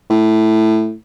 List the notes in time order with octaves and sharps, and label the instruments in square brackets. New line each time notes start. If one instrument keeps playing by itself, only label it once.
[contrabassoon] A2